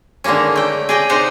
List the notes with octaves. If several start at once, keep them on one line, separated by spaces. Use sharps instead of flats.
D3 D#3 G#3 A#3 C#4
A3 G5
G#4 D5 D#5 G5
C3 D4 D#4 C5 F#5 A5